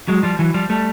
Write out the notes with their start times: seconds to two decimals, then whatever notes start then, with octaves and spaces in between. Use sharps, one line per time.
0.08 F#3 G#3
0.23 F3 G3
0.39 E3 F#3
0.54 F3 G3
0.70 G3 A3